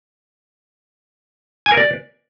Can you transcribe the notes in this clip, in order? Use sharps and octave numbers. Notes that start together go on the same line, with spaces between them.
G#5
A#4
D5